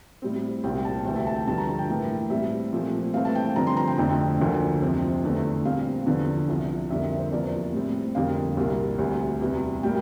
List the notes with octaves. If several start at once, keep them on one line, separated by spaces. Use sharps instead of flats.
A2 G3 C4
C2 A#2 G3 C4 G5
A5
D2 C3 E3 A3 G5
E5
A5
G5
G2 D3 F3 A3 A5
A#5
A5
G5
A2 E3 A#3
A2 G3 C4 E5
A#2 F3 A3 C4
G2 E3 A3 C4 F5
A5
G5
G5
G2 D3 F3 C4 A#5
C6
A#5
G5
F2 D3 A3 C4 G5
D2 D3 F3 A#3
F2 C3 F3 C4
E2 D3 A3
A#2 G3 C4 F5
E2 D3 F3
C2 C3 F3
F2 D3 G3 A#3 E5
E5
C5
E2 C3 F3 A#3 D5
A2 G3 C4
F2 D3 G3 A#3 F5
C2 A#2 G3 A#3
D2 C3 G3
E2 C3 G3
A2 G3 A#3 G5